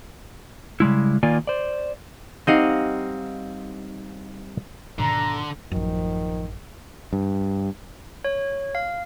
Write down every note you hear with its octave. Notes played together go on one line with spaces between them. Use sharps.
C#3 G3 G#3 E4
D#3 A#3 F4 D5 G#5
C5 D5
G3 C4 D#4 D#5 F5 F#5
G#2 B2 D3 D#3 A#5
A1 F#2 D#3 F3
G2
C#5
F5